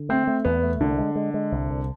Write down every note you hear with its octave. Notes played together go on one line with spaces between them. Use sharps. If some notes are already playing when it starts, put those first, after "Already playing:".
Already playing: D3
A3 C4
A3
E2 B3
A3
C2 D3
G#3
G#3
G#3
C2
C2